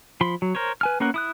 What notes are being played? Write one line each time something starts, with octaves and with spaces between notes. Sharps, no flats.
F3 B5 C6
F#3
A#4 C5 C#5
B4 G#5 F6
A#3 B3 C#4 A#4 F#5
E4 D#6 F#6